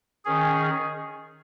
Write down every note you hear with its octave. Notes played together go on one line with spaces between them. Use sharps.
D#3 C#4 G#4